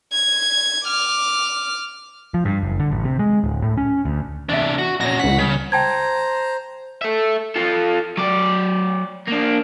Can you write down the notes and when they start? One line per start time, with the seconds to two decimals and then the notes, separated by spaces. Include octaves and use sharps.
0.12 G#6
0.85 D6 F6
2.34 F3
2.45 G2
2.63 F#1
2.80 D3
2.91 A1
3.05 C3
3.19 G#3
3.44 D1
3.62 A2
3.78 C#4
4.05 D2
4.49 E2 C3 D4 E5
4.78 F#4
5.01 F2 A#2 C#4 F#4 A#6
5.19 C#2 F#5 B6
5.38 E2 C#3 G3
5.72 C5 G5 A5 A#5 G#6
7.01 A4 E5
7.56 F4 A4
8.17 F#3 D5
9.28 A#3 D4